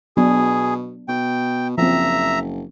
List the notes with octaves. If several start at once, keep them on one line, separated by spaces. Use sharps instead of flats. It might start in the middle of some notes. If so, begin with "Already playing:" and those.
B2 F#3 B3 D4 G#4
B2 G5
F#1 F3 C4 E5 A#5